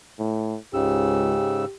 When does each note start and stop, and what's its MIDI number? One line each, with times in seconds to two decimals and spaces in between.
0.19 0.57 45
0.74 1.37 37
0.74 1.65 44
0.74 1.65 49
0.74 1.77 67
0.74 1.65 88